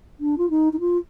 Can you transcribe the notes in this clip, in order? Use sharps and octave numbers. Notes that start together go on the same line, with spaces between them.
D4
F4
D#4
D#4
F4